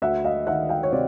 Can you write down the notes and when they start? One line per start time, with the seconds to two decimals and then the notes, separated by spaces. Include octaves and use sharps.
0.02 D2 E5 F#5
0.24 D#5 F5
0.47 D#3 E5 F#5
0.69 F5 G5
0.83 C#5
0.92 C3 C5 D5